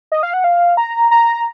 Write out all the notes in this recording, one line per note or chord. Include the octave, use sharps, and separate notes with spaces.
D#5
F5
F#5
F5
A#5
A#5